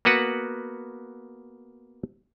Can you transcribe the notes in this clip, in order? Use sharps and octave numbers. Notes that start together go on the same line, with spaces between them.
A#3 B3 F#4 B4 F#5